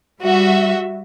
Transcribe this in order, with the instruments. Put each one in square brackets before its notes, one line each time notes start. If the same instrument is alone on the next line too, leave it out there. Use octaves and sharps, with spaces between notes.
[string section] G3 F#4 E5